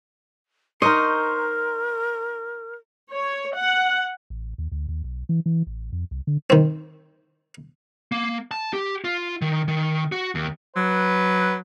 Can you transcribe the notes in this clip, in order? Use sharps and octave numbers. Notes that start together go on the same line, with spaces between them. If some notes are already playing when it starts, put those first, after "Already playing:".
D#4 A#4 C5 D#5 C6 C#6 F6
C#5
F#5
A1
D#2
D2
D#2
B1
E3
E3
A1
F2
C2
D3
D#3 C4
A#3
A5
G4
F4
D#3
D#3
F#4
D#2
F#3 B4